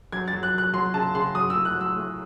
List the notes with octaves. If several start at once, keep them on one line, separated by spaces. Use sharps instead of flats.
F#3 G#6
A6
F#3
F#6
F#3 F#6
F#3 C6
C#3 A5
C#3 C6
F#3 D#6
A2 E6
F#6
F#3
E6
A2